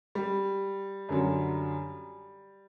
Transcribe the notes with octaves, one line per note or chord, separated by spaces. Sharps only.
G3
F#2 D3 F#3